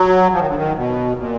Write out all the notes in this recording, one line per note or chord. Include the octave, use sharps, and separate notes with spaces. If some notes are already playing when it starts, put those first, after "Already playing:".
Already playing: F#3
F3
D#3
D3
D#3
B2
A#2